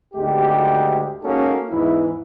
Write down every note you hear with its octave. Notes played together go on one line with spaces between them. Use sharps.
G#1 D2 G#3 G4
G#3 A#3 C#4 D#4 F#4 A4
E2 G#2 E3 D#4 E4